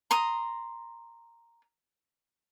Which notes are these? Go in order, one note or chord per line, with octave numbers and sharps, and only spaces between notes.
A#5 C6 D#6